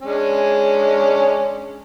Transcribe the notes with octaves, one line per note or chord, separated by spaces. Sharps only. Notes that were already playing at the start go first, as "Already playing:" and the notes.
G#3 C#4 D4